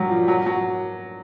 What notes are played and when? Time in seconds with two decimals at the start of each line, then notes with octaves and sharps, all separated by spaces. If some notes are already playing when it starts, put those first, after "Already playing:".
Already playing: F#3 G3
0.09 F3
0.28 F#3
0.46 F#3